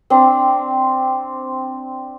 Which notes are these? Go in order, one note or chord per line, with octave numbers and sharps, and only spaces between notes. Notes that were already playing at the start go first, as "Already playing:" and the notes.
C4 D4